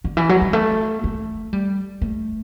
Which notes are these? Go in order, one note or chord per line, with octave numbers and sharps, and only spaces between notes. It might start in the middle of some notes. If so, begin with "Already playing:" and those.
D3
E3
F#3
G3
A3
A3
G3
A3